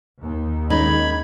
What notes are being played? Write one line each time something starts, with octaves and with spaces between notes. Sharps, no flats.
D#2
D#3 G#3 C#4 D#4 B5 G#6